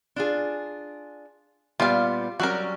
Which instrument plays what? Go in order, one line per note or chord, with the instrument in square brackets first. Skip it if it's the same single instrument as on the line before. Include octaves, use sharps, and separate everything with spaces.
[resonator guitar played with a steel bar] D4 F4 G#4
[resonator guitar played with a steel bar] A#2 G3 B3 [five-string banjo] F4 F5
[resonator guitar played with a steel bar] F#3 G3 C#4 [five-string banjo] F#4 A#4